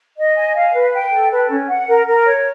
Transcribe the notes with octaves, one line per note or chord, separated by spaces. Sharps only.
D#5
G#5
F5
B4
G5
A4
B4
C#4
F#5
A#4
A#4
C#5